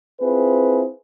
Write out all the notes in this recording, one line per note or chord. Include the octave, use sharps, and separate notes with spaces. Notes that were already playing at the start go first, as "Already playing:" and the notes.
C4 E4 F4 G#4 B4